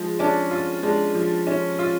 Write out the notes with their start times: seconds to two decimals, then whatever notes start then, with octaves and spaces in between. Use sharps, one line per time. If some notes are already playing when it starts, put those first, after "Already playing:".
Already playing: F3 G#3 G#4
0.19 C#4 D4
0.51 F4
0.83 G#3 D4
1.14 F3
1.47 C#4
1.79 F4